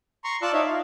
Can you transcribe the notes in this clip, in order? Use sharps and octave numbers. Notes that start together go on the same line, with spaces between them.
A#5 C6 C#6
F4 D5 A5 E6 F#6
D#4 C#5 E5
F5